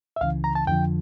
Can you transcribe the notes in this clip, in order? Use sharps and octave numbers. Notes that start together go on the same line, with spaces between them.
E5
C#2 C#3 E3 F5
A#5
A5
F2 D3 F3 G5